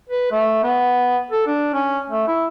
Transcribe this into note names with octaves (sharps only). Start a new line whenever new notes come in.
B4
A3
B3
A4
D4
C#4
A3
E4